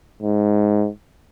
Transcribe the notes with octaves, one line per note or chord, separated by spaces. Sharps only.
G#2